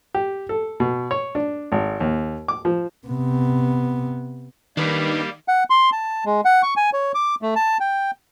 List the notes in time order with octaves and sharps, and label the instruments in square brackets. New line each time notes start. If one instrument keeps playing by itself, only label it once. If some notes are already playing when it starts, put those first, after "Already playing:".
[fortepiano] G4
A4
B2
C#5
D4
G#1
D#2
D6
F3
[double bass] C3 B3
[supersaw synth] D#3 [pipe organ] G3 A#3 G4 [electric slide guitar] D4 B4
[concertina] F#5
C6
A5
G#3
F#5
C#6
G#5
C#5
D6
A3
A5
G5